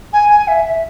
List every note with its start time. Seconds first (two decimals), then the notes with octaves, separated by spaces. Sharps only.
0.13 G#5
0.29 G#5
0.48 E5
0.65 E5